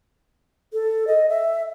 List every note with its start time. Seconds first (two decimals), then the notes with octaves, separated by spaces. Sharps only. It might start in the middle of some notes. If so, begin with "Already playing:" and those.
0.73 A4
1.07 D#5
1.29 E5